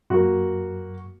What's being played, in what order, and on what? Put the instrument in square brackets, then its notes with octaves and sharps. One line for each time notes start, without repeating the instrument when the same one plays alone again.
[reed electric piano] F#2 [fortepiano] A#3 F#4